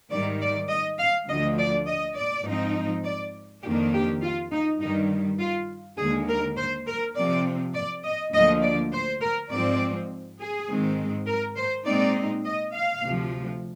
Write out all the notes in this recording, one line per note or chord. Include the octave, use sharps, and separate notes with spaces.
G#2 D#3 G3 D5
D5
D#5
F5
D2 D3 F3 D#5
D5
D#5
D5
G#2 F3 C4 D#4
D5
F2 D#3 A#3 D4 G4
G4
F4
D#4
G2 D#3 G3 D#4
F4
D#2 D3 G#3 G#4
A#4
C5
A#4
C3 F3 C4 D5
D5
D#5
D2 D3 F3 A#3 D#5
D5
C5
A#4
G#2 F3 G#3 C4 D5
G#4
G#2 D#3 G#3 C4
A#4
C5
A#2 G#3 C4 D#4 D5
D#5
F5
D2 C3 F3